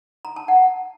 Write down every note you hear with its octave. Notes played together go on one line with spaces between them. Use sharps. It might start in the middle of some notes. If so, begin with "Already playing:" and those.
A#5
A5
F#5